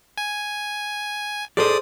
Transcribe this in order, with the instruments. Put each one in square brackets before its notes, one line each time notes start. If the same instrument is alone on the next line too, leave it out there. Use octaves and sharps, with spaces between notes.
[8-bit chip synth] G#5
[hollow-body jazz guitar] G#4 A4 C5 [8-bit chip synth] D5 D#6